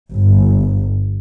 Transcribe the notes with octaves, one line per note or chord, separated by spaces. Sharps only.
G1